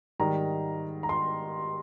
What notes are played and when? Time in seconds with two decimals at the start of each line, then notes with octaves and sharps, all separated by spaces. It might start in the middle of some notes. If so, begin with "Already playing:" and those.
0.20 G#2 D#3 G3 A#5
1.03 A#5
1.09 C6